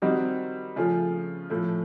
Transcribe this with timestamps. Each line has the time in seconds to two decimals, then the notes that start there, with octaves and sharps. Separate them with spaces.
0.02 D#3 G3 C4 D#4 F#4
0.76 C#3 F3 A3 C#4 F4
1.50 A2 F3 A3